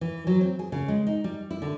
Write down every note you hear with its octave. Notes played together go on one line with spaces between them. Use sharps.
E3
F#3
C4
G#4
C#3
G#3
D#4
G3
E4
D3